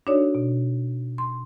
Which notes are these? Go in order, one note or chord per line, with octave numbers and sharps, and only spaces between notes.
D4 D#4 F#4 A4 C#5 D5
B2
C6